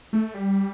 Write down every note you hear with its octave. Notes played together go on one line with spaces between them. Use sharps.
A3
G3